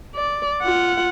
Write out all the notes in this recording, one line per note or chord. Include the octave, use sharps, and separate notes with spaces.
D5
F4 F#5